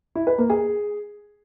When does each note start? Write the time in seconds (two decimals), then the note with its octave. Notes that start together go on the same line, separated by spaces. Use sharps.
0.15 E4
0.27 B4
0.38 A#3
0.50 G#4